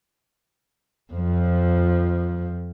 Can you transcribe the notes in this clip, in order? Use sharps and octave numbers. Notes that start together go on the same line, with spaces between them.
F2 F3